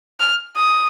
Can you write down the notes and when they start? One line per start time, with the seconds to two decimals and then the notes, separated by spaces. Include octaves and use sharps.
0.20 F6
0.57 D#6